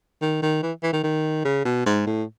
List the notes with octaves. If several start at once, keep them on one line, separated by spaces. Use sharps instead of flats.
D#3
D#3
E3
E3
D#3
D#3
C#3
B2
G#2
A2